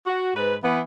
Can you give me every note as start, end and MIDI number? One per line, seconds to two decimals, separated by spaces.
0.07 0.31 66
0.37 0.57 44
0.37 0.57 71
0.63 0.81 52
0.63 0.81 59